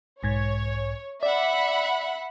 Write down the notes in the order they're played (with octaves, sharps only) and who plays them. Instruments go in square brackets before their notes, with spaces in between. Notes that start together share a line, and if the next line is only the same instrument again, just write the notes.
[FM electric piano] B1 G#2 G#6 [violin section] C#5
[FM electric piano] D5 [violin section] E5 F#5 B5